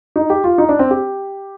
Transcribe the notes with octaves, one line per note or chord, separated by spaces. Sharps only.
D#4
G4
F4
D#4
D4
C4
G4